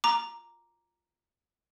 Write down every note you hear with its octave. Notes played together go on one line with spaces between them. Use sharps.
A#5 D6